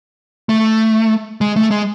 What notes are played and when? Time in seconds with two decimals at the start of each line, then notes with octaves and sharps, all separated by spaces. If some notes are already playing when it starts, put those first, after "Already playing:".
0.49 A3
1.41 G#3
1.56 A3
1.71 G#3